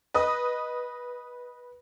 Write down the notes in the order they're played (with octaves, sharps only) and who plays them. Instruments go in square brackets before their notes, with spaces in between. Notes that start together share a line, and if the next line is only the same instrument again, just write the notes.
[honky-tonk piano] B4 D#5 D#6